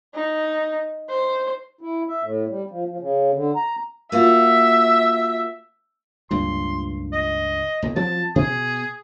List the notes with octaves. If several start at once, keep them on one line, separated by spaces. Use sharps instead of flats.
D#4
C5
E4
E5
A2
G3
F3
F3
C#3
D3
A#5
A#3 F4 F#4 E5
C#2 G2 A#2 C6
D#5
B1 A#2
F3 F#3 C4 A5
B2 G#4